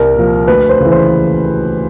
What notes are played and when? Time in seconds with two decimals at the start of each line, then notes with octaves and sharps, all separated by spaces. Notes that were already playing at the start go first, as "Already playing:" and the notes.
Already playing: C2 A#4
0.15 A#2 F3
0.47 D2 B4
0.69 C5
0.80 C#3 E3
0.92 C5